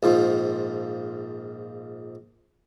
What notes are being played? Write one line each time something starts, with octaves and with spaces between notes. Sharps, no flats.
A#1 G#2 F3